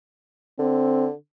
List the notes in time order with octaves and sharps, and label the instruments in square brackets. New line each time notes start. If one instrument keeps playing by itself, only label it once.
[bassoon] D3 [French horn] C4